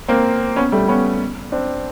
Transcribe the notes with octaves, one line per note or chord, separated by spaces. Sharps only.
A#3 C4
B3 C#4
G3 A3
B3 C#4
C4 D4